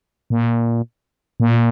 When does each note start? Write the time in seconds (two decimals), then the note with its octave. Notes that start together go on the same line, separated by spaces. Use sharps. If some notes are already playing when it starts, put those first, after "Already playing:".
0.30 A#2
1.40 A#2